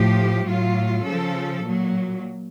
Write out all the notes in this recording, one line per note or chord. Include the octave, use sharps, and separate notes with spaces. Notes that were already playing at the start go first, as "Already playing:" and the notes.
Already playing: A2 F3 G4
A2 F#3 F4
C#3 F3 A4
A#2 F#3